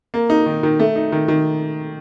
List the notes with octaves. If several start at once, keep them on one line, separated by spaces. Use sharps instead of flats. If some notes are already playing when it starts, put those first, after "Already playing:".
A#3
D#4
D#3
D#3
A3
D#4
D#3
D#3